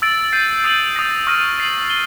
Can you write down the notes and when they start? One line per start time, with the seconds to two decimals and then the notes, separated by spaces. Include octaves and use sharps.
0.02 E6 A6 D7 F#7
0.33 G6 C7 D#7
0.64 D#6 G6 C7 D#7 F#7
0.96 D#6 G6 A#6
1.27 C#6 F6 A#6 D#7
1.58 A6 C7 D#7 F#7
1.90 D#7 G7